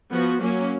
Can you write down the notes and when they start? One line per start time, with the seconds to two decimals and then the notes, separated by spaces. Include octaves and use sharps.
0.11 F3 B3 F#4
0.40 F#3 A#3 C#4